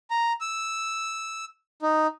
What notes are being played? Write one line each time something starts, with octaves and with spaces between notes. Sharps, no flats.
A#5
E6
D#4